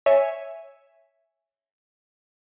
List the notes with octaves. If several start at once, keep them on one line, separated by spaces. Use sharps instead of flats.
C#5 E5 G#5